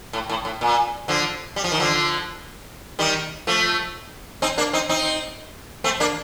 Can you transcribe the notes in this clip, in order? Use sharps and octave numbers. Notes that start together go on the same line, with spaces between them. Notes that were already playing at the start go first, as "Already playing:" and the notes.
A2
A2
A2
A#2
D3 F3
G3
F3
D#3
D3 F3
D#3 G3
F3 A3
C4 D#4
A#3 D4
C4 D#4
C4 D#4
A3 C4
A#3 D4